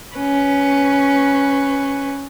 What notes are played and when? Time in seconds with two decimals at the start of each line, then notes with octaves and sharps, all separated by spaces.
0.15 C#4 B4